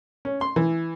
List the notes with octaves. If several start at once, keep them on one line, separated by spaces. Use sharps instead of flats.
C#4
C6
E3